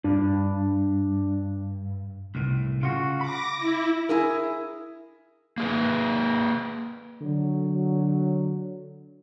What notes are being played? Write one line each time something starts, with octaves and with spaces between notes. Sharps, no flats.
G2 D4
C2 A2
C#3 F4 F#4
B5 D6 A#6
E4
E4 G#4 A#4
A#3 G#4 B4
D3 F#3